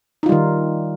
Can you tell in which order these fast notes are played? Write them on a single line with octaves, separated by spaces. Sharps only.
D#4 F4 G3 D#3